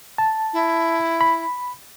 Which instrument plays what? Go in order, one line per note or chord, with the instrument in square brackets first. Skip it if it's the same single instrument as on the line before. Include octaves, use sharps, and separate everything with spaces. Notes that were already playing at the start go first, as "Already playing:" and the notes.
[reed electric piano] A5
[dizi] E4
[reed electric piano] B5